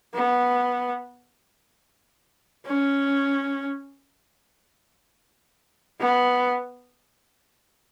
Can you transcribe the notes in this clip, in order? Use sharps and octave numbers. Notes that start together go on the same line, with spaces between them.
B3
C#4
B3